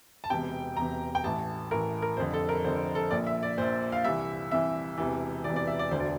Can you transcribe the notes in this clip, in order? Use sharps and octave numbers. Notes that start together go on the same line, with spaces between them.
A5
E1 E2 C3 G5
E1 E2 C3 A#5
G5
A1 A2 E3 A5
A1 A2 E3 A#4
A#4
F1 F2 D3 C5
A4
A#4
F1 F2 D3 C5
A4
A#1 A#2 D5
E5
D5
A#1 A#2 C5
F5
C2 C3 E3 E5
C2 C3 E3 E5
E1 E2 C3 E3
E1 E2 C3 E3 D5
D5
E5
D5
E1 D2 D3 C5
D5